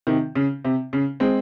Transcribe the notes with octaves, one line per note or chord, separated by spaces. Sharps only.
C3 D#3
C#3
C3
C#3
G#3 C4